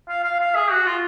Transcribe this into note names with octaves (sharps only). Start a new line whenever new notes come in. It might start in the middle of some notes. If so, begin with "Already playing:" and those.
F5
F5
F5
G#4
F#4
F4